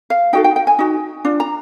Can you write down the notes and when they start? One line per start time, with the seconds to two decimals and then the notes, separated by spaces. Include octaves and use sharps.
0.10 F5
0.33 D#4 F#4 A4 G5
0.44 G5
0.56 G5
0.67 G#5
0.79 D#4 F#4
1.25 D4 F4
1.40 A#5